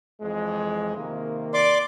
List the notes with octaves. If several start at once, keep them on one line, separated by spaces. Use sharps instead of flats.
F2 E3 G#3
C3 D#3 A#3
D5 C6 D6